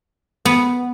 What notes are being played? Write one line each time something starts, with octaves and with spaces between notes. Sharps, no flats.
B3